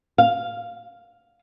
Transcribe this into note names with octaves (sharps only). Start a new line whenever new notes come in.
F5